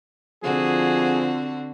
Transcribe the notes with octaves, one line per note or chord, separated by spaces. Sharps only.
D3 F3 C4 F#4 G#4